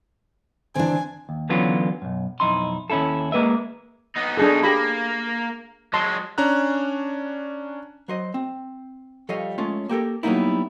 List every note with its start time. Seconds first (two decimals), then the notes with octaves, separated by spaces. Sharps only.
0.76 D3 E3 C4 D4 G#5
1.29 D#2
1.50 D3 E3 F#3 B3 C#4 F4
2.02 B1 F#2
2.40 B1 F2 D#4 E4 C6
2.90 D#2 C#4 E4 F4 A4
3.32 G#3 A#3 B4 D#5 E5
4.16 B3 D#4
4.37 B2 D4 D#4 G#4 A4
4.63 A#3 G4 G#4 B5
5.94 F#3 G#3 A5 C6
6.38 C#4 D4 A#5 F#6
8.08 F#3 C5 D#5
8.34 C4
9.29 F3 G3 A4 C#5 D#5 F5
9.58 G#3 A3 C#4 F4
9.89 A#3 G4 A4 A#4
10.23 F#3 G3 A#3 B3 D#4 E4